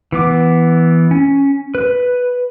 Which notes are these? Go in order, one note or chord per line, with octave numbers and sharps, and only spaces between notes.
E3 B3 D6
C#4
B4